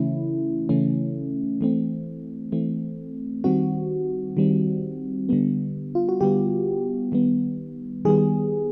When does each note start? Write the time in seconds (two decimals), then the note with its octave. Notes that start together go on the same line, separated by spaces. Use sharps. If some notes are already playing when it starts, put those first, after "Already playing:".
Already playing: C#3 E3 A3 C#4 E4
0.69 C#3 E3 A3 C#4
1.61 E3 A3 C4
2.52 E3 A3 C4
3.44 D#3 G3 C4 F#4
4.37 D#3 G3 C4
5.29 D3 G3 B3
5.95 F4
6.09 F#4
6.21 D3 G3 B3 G4
7.12 D#3 G3 B3
8.05 D#3 G3 B3 G#4